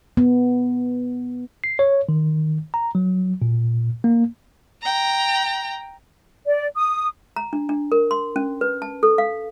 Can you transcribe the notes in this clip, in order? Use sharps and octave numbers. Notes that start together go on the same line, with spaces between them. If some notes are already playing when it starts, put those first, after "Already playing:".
B3
C7
C#5
D#3
A#5
F#3
A#2
A#3
G5 A#5
D5
D#6
A#5
D4
D4
A#4
C6
C#4
B4
A5
A4
F5